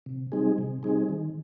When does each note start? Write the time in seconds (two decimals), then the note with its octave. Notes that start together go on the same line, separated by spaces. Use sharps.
0.06 C3
0.32 G3 C4 D#4 G#4
0.58 C3
0.83 G3 C4 D#4 G#4
1.09 D#3